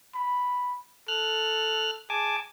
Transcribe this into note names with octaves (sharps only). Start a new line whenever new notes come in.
B5
A4 F6 F#6
G#4 G#5 A5 D6